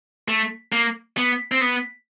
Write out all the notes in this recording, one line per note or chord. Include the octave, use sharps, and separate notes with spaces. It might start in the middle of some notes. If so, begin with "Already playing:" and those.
A3
A#3
B3
C4
B3